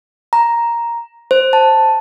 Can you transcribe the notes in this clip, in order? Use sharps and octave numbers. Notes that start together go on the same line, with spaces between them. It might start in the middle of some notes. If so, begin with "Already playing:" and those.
A#5
C5
A5